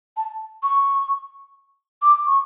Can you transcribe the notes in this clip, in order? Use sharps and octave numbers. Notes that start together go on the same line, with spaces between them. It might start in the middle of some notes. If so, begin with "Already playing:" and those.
A5
C#6
D6
C#6